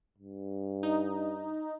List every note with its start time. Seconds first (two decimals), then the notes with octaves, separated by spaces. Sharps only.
0.18 G2
0.83 D#4